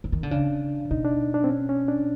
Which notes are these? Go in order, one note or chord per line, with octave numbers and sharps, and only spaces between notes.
E3
D#3
D3
C#3 D4
B2 D#4
D4
D4
C4
C#4
C#4
D4